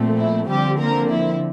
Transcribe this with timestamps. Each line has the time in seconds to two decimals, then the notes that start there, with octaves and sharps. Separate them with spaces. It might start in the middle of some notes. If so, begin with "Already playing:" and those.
Already playing: A#2 F3 A3 C4
0.18 E4
0.49 D3 F3 G3 C4 G4
0.80 A#3 A#4
1.11 E4